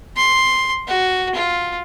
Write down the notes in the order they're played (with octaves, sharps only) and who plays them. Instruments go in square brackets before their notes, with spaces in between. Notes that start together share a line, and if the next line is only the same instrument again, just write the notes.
[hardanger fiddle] C6
F#4
F4